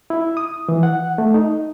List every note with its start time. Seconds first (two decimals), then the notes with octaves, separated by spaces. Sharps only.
0.10 E4
0.37 D#6
0.69 E3
0.83 F#5
1.18 A3
1.34 D#4